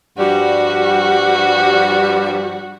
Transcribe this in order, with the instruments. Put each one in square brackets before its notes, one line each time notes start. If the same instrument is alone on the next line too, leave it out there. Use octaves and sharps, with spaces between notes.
[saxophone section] G2 F3 G3 [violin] F#4